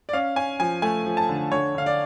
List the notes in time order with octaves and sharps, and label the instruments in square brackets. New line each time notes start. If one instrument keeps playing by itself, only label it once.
[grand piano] D5
C#4 F5
C#4 G#5
F3 G#5
A3 G#5
F3
A5
D3
D3 C#5
D3 F5
D5